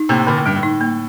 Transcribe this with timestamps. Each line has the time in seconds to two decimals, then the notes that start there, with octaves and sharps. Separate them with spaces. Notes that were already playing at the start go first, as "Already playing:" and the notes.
Already playing: D#4
0.09 A2 C3 A#3
0.27 A#2 D3
0.37 A2
0.46 G2 G3
0.56 A2
0.63 D#4
0.81 A#3